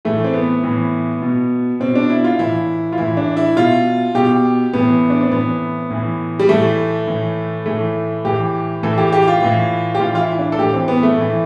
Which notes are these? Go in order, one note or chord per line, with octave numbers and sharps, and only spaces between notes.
A2 E3 A3
C4
B3
A2 E3
B2
B2 C4
D4
E4
F4
A2 E3 E4
F4
A2 E3 E4
D4
E4
B2 F4
B2 G4
A2 E3 B3
D4
C4
A2 E3 B3
A2 E3
G3
A2 E3 A3
A2 E3
A2 E3 A3
A2 E3 G4
A2 E3 A4
G4
G4
F4
A2 E3
G4
A2 E3 F4
F4
E4
D4
A4
A2 E3 G4
C4
B3
A3
A2 E3